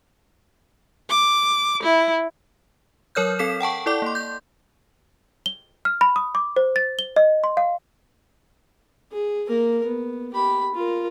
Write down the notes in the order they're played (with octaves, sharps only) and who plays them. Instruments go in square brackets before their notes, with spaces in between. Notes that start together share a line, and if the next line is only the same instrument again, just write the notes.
[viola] D6
E4
[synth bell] F#3 A#4 C#5 F6 G6
C4 A4 B6 E7
F#5 G5 A5 C#6
E4 A4 D5 D6
A#3 C6
G6
[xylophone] G7
F6
B5
D#6
D6
C5
A6
G7
D#5
C6
F5
[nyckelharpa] G#4
A#3 A#4
B3
G4 B5
F4 A#4